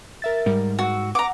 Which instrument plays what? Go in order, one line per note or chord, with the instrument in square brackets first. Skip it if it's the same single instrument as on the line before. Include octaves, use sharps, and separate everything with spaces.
[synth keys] A#4 E5 A6
[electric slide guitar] G#2 [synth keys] G3 A#4
[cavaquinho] F#4 [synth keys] E6
[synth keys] F#5 [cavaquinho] A#5 D6